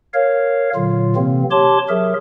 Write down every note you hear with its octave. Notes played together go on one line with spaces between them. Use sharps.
A#4 C#5 F5
A#2 D3 F#3 F4
C3 E3 A#3 C4
G4 C#5 A5 C6 D6
F#3 G#4 A#4 E5